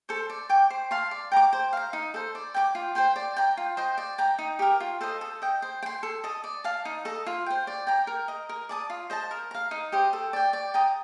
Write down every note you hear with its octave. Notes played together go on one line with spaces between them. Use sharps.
A4 C5
D5
G5 D6
C5
F5 A5 C6
D5
G5 A#5 D6
C5
F5 A#5
D#4
A4 C5
D5
G5 A#5 D6
F4
C5 G5 C6
D5
G5 A#5
F4
C5 D#5 G5
D5
G5 A#5
D#4
G4 A#4
F4
A4 C5 D#5
A4
D#5 G5
C5
G5
C6
A4
D#5 A5 D#6
D5
F5 A5
D#4
A4 D#5
F4
C5 G5
D5
G5 A#5
A#4
D#5 A#5
A#4
D5 A5 D#6
F4
C5 D#5 A5
A#4
F5 A#5
D#4
G4 C5 D#5
A4
D5 G5
D5
G5 A#5 D#6